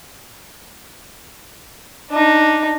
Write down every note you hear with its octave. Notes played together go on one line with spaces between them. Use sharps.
D4 D#4